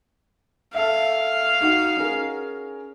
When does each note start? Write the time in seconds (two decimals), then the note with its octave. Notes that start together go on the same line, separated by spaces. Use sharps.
0.74 A4 E5 F5
1.61 D#4 F#4
1.97 C#4 G#4 A#4